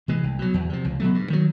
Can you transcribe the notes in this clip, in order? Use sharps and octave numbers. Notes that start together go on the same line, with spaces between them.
C3 E3 G#3
C2
B2 F#3
E2
C3 F3
C#2
B2 F#3 A3
G2
D#3 F#3